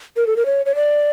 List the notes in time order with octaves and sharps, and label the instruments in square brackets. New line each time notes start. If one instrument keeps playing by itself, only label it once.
[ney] A#4
A4
A#4
C#5
C#5
D5